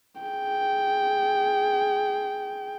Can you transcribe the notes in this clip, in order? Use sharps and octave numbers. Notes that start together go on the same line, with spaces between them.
G#4 G5